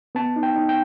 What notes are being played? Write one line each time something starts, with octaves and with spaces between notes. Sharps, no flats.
B3 A5
D#4
G5
D#4
G5